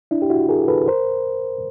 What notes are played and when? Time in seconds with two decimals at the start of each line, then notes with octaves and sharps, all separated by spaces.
0.11 D4 E4
0.22 G4
0.30 E4 F#4
0.49 G#4 A#4
0.68 A4 B4
0.88 A#4 C5